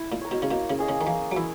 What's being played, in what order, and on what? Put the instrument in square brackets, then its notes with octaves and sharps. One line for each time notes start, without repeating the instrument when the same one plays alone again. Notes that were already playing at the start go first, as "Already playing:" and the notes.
Already playing: [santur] E4
[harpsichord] A#2
[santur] A#4 C#5
[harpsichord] B2
C#3
[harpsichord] B2 [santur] A#3
[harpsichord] C#3
[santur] C#4 G#4 D#5
[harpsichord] C#3
D#3
[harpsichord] E3 [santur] A#3
[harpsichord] F#3
[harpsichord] E3 [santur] E4